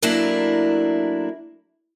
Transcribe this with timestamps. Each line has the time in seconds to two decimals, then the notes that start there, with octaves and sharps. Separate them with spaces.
0.02 F#3 A3 A#3 D4 E4